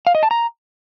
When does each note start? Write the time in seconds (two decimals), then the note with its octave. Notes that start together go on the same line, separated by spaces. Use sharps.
0.07 F5
0.15 D#5
0.23 A5
0.31 A#5